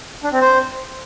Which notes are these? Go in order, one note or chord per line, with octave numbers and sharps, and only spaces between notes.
D4
C4
C5